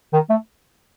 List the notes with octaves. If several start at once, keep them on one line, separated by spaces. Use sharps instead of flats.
D#3
A3